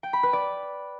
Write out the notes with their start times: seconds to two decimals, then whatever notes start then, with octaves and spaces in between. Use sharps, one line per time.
0.03 G5
0.13 B5
0.23 B4
0.33 D5